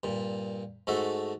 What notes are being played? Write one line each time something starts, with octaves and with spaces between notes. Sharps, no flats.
G2 A#2
G#2 A3 F#4 A4 E5